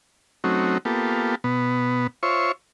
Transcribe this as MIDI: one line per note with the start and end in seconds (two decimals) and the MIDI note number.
0.44 0.78 54
0.44 0.78 57
0.44 0.78 60
0.44 0.78 61
0.44 0.78 63
0.44 0.78 66
0.85 1.35 58
0.85 1.35 59
0.85 1.35 65
0.85 1.35 67
0.85 1.35 69
1.44 2.07 47
1.44 2.07 59
2.23 2.52 65
2.23 2.52 72
2.23 2.52 73
2.23 2.52 76
2.23 2.52 85